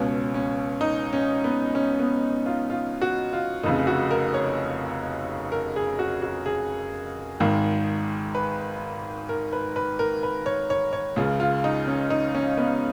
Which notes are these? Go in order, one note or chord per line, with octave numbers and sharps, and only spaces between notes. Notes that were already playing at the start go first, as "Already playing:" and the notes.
Already playing: C#2 B2 C#4
C#4
D#4
C#4
B3
C#4
B3
F4
F4
F#4
F4
F1 F2 C#3 D#4
F#4
A#4
C#5
A#4
G#4
F#4
F#4
G#4
G#1 G#2 D#3
B4
A#4
B4
B4
A#4
B4
C#5
C#5
C#5
C#2 C#3 F4
F4
D#4
C#4
D#4
C#4
B3